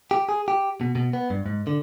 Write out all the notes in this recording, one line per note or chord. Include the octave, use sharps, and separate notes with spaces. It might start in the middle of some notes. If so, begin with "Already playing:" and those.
G4
G#4
G4
B2
B2
B3
G2
G#2
D3